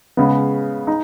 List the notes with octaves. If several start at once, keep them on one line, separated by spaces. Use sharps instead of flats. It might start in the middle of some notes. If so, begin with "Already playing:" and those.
C#3 G#3 B3
D#4